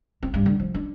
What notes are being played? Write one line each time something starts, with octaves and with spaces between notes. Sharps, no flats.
C4
G2
D3
F3
D4